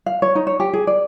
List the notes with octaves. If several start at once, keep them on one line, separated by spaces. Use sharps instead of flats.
F5
C#5
D#4
C#5
G4
G#4
D5